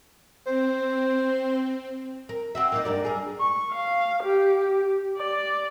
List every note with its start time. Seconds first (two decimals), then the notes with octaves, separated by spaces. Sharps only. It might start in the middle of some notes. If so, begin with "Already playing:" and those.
0.47 C4 C5
2.29 A#4
2.55 C4 F#4 E5
2.72 A#3 D4 D#4
2.85 G2 A#4 D5
3.05 G#4 A#4
3.40 C#6
3.72 F5
4.23 G4
5.18 D5